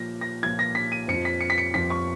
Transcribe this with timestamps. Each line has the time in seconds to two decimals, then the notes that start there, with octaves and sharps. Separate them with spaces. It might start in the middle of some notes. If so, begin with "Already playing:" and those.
Already playing: A#2 F3 A#6
0.21 A#6
0.43 F3 G#6
0.46 A#2
0.59 A#6
0.75 B6
0.92 D#7
1.08 F2 C#7
1.13 F3
1.25 B6
1.41 C#7
1.50 B6
1.58 C#7
1.74 F2 F3 B6
1.90 C#6